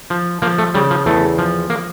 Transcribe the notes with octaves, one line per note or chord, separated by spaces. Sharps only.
F3
F3 A#3
A3
C#3 G3
F3
E2 A3
F3
A#3